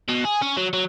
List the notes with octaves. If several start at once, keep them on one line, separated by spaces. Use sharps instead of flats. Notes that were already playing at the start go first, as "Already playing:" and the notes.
B2
G#4
C#4
F#3
F#3